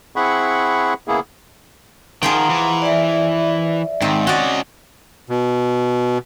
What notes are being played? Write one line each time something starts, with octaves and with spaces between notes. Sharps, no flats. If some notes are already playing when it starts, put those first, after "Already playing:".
C4 E4 G#4 F#5 B5 C#6
C#3 A#3 B3 E4 G#4
D#3 F3 G#4 F#5 G5 A#5 C6
E3
D5 E5
G#2 D#3 C4
C#4 F#4 D5 D#5
B2